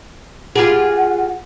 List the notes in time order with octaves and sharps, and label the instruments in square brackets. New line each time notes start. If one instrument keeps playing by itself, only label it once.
[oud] F4 G4 G#4 [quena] F#5